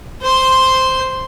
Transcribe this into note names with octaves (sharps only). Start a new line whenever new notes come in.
C5 C6